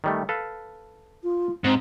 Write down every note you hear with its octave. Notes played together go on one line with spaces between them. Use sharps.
D#3 G3 A3
A4 B4 F5
F4
G#2 C4